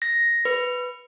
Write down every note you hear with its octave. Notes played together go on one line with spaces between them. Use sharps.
A#6
B4